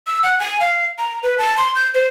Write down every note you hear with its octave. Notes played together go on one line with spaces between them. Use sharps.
E6
F#5
G#5
F5
A#5
B4
A5
C6
G6
C5